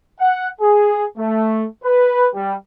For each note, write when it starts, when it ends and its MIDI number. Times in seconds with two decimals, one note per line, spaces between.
0.20 0.48 78
0.61 1.05 68
1.17 1.66 57
1.84 2.27 71
2.35 2.54 55